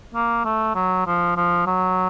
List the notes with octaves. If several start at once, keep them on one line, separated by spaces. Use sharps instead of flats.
A#3
A3
F#3
F3
F3
F#3